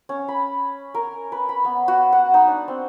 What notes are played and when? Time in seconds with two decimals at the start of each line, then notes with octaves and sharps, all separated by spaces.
0.09 C#4
0.28 B5
0.94 A#4
1.32 B4
1.49 B5
1.65 B3
1.88 F#4
2.12 F#5
2.34 D#4
2.48 D4
2.68 C4